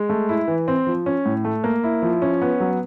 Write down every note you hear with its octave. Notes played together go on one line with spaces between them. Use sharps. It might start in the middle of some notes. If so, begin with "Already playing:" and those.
Already playing: G#3
A3
E4
E3
C4
F3
C#4
A2
A3
A#3
E4
F3
C#4
B3
F#3